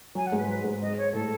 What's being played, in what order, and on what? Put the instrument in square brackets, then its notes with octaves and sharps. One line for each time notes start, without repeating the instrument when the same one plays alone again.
[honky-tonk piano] F#3 [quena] G#5
[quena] F#5
[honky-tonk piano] G#2 G#3
[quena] B4
[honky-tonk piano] F#3 [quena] B4
[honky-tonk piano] G#2 G#3
[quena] D#5
C#5
[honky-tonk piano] A2 A3 [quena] A4